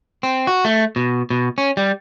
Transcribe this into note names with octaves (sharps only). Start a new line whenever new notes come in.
C4
F#4
A3
B2
B2
C#4
G3